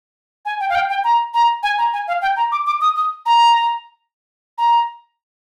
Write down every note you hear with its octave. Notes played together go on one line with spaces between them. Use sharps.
G#5
G5
F5
G5
G5
A#5
A#5
G#5
A#5
G#5
F5
G5
A#5
D6
D6
D#6
D#6
A#5
A#5